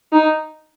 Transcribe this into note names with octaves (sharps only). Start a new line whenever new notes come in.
D#4